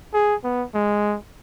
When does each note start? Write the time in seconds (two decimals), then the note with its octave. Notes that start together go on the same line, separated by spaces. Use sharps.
0.14 G#4
0.44 B3
0.75 G#3